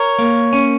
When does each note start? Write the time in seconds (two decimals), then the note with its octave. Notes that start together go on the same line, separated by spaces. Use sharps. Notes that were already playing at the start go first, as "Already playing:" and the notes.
Already playing: A#4 C#5
0.19 A#3
0.53 C#4